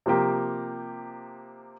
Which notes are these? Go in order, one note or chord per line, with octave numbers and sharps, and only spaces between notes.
C3 F3 A#3 G4